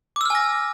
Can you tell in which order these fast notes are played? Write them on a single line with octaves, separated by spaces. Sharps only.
D6 E6 F6 G#5 A#6